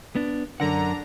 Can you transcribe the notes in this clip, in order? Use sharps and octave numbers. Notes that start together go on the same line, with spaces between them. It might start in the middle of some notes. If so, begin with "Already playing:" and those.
B3 D4
F#2 D3 A#4 F#5 A#5